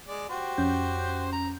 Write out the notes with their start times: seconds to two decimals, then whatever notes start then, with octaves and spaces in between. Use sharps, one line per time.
0.08 G#3 D5
0.29 F#4 G4 C5
0.58 F2 C#4 G6
1.32 A#5